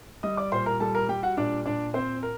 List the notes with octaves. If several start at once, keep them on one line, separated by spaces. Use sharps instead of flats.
G3 D#5 D#6
D5 D6
A#2 C5 C6
A#4 A#5
G3 A4 A5
A#4 A#5
G3 G4 G5
F#4 F#5
A#2 D4 D5
A#2 D4 D5
C4 C5
A#4